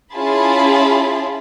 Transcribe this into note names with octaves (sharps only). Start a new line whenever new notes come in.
C#4 E4 F4 G#4 A5 B5